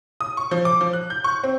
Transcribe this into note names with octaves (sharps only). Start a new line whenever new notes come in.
D#6
C#6
F3
D6
F3
F#6
G6
C#6
C4